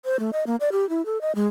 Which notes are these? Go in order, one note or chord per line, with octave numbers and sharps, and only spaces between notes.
C5
A3
D#5
A#3
D5
G4
E4
A4
D#5
G#3